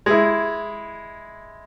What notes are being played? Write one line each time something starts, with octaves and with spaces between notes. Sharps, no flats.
G#3 E4